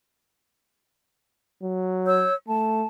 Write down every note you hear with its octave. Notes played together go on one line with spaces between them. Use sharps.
F#3
C#5 E6 G6
A3 A5